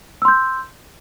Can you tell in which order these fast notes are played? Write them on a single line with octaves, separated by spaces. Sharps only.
E6 C6 G6